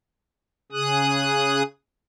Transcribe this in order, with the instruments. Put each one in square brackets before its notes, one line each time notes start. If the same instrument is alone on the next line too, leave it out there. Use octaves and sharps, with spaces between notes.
[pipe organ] C#3 G#4 D#6 F#6